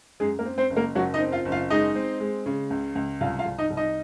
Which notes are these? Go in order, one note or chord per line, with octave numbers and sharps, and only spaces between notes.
F#2 G#3 G#4
A#3 A#4
C4
C4 C5
F#1
A#3 A#4
F#1 F#3 F#4
D#4 D#5
C4
F4 F5
F#1
F4 F5
G#3 D#4 D#5
C4
G#3
C#3
C#2
C#2
C2 F4 F5
F4 F5
C2
D#4 D#5
C2
D#4 D#5